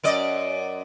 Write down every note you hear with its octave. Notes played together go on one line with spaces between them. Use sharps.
F#2 D5 D#5